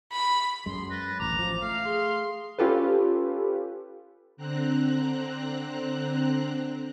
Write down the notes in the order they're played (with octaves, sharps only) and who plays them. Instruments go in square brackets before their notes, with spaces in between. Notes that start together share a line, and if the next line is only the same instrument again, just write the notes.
[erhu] B5
[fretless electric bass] F#2 G#3 [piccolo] C6
[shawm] B4 [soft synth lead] A6 [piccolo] A#6
[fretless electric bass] D1 A1 [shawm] A#5 [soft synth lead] D6 [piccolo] F7
[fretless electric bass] A1 F3
[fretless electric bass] A3 [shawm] F5
[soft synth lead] G#4 [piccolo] C6
[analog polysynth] C#4 F4 G4 A4 B4
[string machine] D3 C4 A#5 F#6